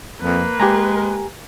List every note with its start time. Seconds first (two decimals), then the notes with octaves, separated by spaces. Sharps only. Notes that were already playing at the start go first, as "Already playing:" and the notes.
0.21 F2 A#3 B4
0.60 G#3 G4 G#5 A#5